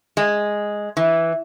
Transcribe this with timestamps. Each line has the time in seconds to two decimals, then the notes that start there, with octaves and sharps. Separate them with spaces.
0.17 G#3
0.97 E3